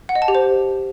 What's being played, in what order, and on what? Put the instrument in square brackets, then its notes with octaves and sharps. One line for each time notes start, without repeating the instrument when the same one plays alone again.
[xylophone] F#5
D#5
A5
G4
C5